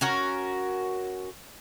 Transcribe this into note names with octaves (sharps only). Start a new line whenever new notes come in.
C#4 F#4 A#4